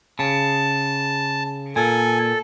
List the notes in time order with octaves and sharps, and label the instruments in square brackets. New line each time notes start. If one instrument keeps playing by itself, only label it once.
[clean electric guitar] C#3 [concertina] A5
[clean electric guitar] A#2 [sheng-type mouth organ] A4 [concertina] G#5